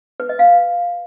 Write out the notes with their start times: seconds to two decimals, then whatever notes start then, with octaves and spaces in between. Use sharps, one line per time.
0.20 B4
0.29 D#5
0.39 F5